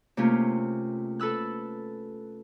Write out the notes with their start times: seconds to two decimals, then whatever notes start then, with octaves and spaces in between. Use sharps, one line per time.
0.17 C3 A3 A#3 C#4 F4
1.20 A4 B4 E6 F#6